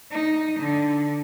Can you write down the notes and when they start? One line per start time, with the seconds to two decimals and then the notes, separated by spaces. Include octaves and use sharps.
0.12 D#4
0.59 D3